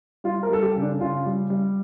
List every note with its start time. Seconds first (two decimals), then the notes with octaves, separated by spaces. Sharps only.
0.24 G3 F4
0.43 A#4
0.49 G3 A4
0.62 G4
0.75 C#3
0.82 D4
1.00 C#3 F4
1.26 G3
1.50 G3